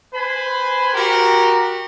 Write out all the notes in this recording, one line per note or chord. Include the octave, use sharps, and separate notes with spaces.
B4 C5 G#5 B5
F#4 G4 A#4